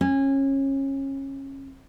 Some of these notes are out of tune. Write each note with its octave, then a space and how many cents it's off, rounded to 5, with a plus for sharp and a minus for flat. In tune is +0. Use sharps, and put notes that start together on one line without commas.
C#4 -25